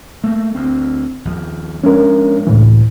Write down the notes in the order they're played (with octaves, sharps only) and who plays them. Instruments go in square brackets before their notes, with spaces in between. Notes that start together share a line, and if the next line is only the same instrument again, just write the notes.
[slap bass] A3 A#3
D2 C4
D#2 F3
[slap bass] F3 G#3 D4 [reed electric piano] C#4 A#4
[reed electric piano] C#2 A2 E3